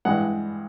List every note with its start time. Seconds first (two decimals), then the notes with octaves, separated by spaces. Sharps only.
0.05 G2 E3 G#3 F#5